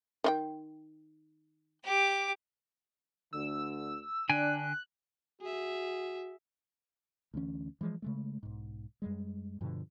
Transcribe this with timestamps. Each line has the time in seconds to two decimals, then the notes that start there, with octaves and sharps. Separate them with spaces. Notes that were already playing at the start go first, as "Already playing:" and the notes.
0.24 D#3 F4 G5
1.84 G4 D6
3.33 D2 D3 E6
4.29 D3 D4 G5 G#5 F#6
5.42 F#4 G#4 E5
7.34 D2 E3 C#4
7.81 E3 F3 G#3
8.02 C#3 G#3 A3
8.43 B1 G#2
9.02 F#2 G3 G#3
9.61 G2 B2 D3 F3